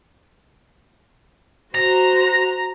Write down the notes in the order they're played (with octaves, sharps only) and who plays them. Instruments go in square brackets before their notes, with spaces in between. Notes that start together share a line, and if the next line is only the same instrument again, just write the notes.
[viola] F#4 C5 [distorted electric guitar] A#5